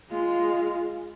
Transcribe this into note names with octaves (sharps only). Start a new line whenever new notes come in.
G#3 F4